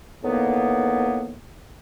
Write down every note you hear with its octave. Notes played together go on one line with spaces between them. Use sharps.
E2 A2 D#3 A#3 B3